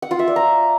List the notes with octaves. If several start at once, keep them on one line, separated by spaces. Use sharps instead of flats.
F#5
F4
E5
D5
A#5